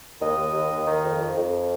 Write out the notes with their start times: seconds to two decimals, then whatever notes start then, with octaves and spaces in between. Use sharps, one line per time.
0.21 D#2 D#5
0.38 D#2
0.53 D#2
0.70 D#2
0.87 D#3
1.04 F2
1.20 F2
1.37 F2